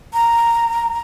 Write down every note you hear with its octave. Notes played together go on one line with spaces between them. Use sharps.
A#5